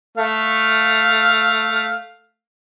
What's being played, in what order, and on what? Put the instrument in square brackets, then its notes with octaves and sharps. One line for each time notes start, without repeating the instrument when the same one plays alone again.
[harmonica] A3 F5